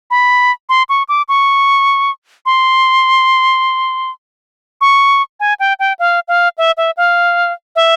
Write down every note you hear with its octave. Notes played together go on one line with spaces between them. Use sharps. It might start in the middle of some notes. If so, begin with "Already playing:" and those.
B5
C6
C#6
D6
C#6
C6
C#6
G#5
G5
G5
F5
F5
E5
E5
F5
E5